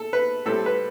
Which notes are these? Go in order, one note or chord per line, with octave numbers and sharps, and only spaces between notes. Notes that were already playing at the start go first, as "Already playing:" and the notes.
Already playing: A4
B4
A2 G3 C4 A4
B4